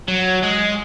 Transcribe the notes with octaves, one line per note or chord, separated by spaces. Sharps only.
F#3
G#3